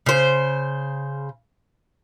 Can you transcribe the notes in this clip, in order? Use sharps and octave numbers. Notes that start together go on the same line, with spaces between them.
C#3 C5